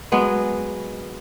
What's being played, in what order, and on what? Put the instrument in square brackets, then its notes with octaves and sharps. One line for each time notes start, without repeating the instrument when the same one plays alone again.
[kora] F#3 G#3 B3